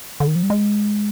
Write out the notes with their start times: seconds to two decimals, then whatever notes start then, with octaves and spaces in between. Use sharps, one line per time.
0.20 D3
0.28 D#3
0.36 F3
0.43 G3
0.50 G#3